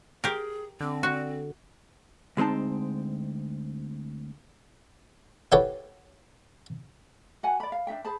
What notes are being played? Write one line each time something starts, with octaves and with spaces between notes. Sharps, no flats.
G4 G#4 A#4
D3 C4
F#4
D2 G#3 C4 D#4 A5
E4 F#4 G4 A4 B4 C#5
F#4 F#5 G#5
D5 B5
F5
D4 D#4 E5 G5
G#4 C5 A5 B5